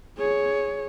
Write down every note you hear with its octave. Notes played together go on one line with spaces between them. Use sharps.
G#4 C#5